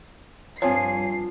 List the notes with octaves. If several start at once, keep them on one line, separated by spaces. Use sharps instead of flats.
G2 F3 C4 C#5 G#5 C7